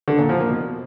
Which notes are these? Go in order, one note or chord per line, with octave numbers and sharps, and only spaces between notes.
D3
A#2
F3
A#3
B2